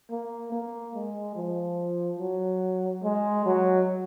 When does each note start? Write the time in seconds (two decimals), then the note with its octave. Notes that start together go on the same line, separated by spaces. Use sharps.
0.11 A#3
0.52 A#3
0.95 G#3
1.36 F3
2.19 F#3
3.03 G#3
3.46 F#3